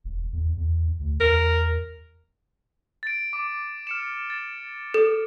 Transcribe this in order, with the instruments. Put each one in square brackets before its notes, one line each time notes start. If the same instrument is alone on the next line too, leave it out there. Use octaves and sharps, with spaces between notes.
[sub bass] E1
E2
E2
D2
[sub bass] E2 [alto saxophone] A#4
[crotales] A6 D7
D6
F6 C#7 E7
A6
[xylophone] A4